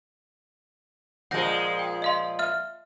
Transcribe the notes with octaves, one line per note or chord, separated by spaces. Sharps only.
A#2 F3 G#3 F#5 G6 A#6
G5
D#5 F5 C6
E5 F6